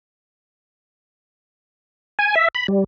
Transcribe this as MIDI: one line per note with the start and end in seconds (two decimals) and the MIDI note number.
2.19 2.35 80
2.36 2.48 76
2.55 2.67 83
2.68 2.84 55